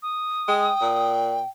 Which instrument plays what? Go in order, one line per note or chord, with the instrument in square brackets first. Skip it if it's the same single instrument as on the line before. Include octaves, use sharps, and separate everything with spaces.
[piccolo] D#6
[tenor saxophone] G#3 [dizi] G5
[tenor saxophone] A#2